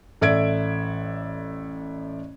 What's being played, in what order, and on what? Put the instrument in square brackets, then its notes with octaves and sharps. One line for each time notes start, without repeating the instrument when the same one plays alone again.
[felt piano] A1 A4 D5 E5 G#6 D7